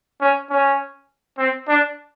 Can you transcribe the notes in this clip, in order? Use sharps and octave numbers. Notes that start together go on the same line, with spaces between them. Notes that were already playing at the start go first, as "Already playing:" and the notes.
C#4
C#4
C4
D4